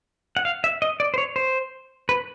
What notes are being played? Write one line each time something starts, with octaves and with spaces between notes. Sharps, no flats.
F#5
F5
E5
D#5
D5
C5
C#5
C5
B4